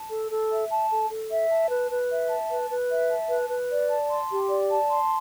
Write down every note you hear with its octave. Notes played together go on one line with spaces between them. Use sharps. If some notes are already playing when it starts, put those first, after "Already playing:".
Already playing: A5
A4
A4
E5
A5
A4
A4
E5
A5
B4
B4
E5
A5
B4
B4
E5
A5
B4
B4
D5
A5
C6
G4
D5
A5
C6